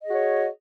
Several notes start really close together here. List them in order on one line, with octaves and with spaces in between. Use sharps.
D#5 G#4 F#4 C#5